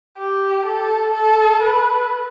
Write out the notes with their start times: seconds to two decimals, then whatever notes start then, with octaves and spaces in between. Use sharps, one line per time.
0.18 G4
0.66 A4
1.14 A4
1.63 B4